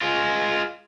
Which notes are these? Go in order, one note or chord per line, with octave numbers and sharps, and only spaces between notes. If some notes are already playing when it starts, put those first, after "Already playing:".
G#3 F4